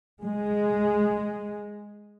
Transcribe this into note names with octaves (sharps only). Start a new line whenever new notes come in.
G#3